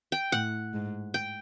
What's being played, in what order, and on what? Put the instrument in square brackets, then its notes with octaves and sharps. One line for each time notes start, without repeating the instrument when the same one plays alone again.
[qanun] G5
[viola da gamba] A2 [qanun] F#5
[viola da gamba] G#2
[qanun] G5